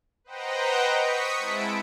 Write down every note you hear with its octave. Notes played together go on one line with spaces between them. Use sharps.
B4 C5 D#5 F#5 G5 A#5
C#6 D#6 B6 C#7
G#3 C4 E4 A5 B5 D7